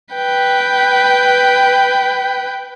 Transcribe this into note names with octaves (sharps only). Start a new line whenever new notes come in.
B4 G5